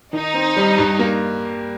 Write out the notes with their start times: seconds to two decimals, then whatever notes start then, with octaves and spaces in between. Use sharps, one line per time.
0.13 D#3 D#4
0.34 C4
0.57 G3
0.78 G2
0.99 A#3